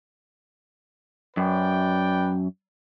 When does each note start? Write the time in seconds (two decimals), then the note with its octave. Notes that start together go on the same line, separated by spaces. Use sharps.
1.37 F#2 B4 D5 G5